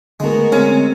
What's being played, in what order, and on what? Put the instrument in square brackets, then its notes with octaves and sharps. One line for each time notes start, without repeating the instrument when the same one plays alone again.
[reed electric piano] D3 A3 [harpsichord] G#3 [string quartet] B3 F#4 A#4
[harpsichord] G#3 [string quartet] C4 [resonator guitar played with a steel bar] C#4